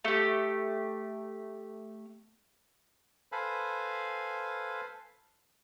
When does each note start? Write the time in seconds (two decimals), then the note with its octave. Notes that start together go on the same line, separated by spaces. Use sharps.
0.05 A3 G4
3.32 A4 B4 C5 F5 G#5 B5